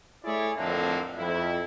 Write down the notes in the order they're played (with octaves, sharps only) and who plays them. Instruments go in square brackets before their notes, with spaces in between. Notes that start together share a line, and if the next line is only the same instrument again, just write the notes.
[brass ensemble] A3 E4 G#4 C#5 D5
F2 A2 D3 A3 A#3 C4
F2 E4